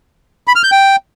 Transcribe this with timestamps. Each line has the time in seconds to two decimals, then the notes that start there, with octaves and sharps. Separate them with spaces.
0.48 B5
0.56 F6
0.64 G6
0.72 G5